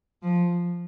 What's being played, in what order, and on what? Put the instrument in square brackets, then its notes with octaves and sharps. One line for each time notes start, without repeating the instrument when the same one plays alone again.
[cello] F3